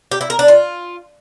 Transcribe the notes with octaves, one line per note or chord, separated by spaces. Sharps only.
G4
E4
A#4
D4
F4